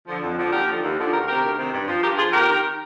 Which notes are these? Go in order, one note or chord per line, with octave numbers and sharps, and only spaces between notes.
D3 F3
F2
D3 F3
D#2 G4 A#4
D3 F3
D#2
D3 F3
D2 G4 A#4
C3 D#3 G4 A#4
D2
C3 D#3
G2
F3
G2 G4 A#4
F3 F4 G#4
F2 G4 A#4
D#3